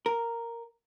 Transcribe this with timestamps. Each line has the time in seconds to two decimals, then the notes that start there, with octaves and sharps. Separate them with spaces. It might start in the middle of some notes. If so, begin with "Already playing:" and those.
0.06 A#4